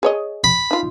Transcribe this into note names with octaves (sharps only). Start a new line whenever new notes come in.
G#4 C#5 D#5
B5
D#4 F4